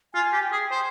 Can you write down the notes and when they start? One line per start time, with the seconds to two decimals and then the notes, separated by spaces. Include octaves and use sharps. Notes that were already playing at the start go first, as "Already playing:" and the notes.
0.14 F4 G#5
0.33 G4
0.43 G5
0.52 G#4
0.71 C5